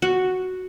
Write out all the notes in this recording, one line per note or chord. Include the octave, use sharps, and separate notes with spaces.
F#4